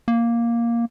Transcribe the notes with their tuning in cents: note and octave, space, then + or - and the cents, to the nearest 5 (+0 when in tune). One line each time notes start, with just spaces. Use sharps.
A#3 +5